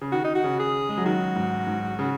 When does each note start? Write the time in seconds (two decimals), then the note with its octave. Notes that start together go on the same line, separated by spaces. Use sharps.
0.01 C#3
0.12 D#3 F#4
0.25 D#4
0.35 F#4
0.44 C#3
0.60 G#4
0.89 G#3
0.98 F#3
1.05 D#3 F#4
1.36 G#2
1.67 G#2
1.99 C#3